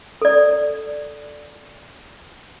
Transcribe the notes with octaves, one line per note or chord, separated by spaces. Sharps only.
A4 D5